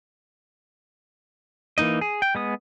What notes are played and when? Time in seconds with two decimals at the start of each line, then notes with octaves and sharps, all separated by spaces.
1.78 E3 A#3 D#4 D#5
2.01 G#4
2.22 G5
2.35 G#3 B3 D#6